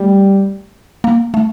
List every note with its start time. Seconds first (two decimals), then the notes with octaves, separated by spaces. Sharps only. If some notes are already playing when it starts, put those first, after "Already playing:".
Already playing: G3 A3
1.04 A#3
1.34 A3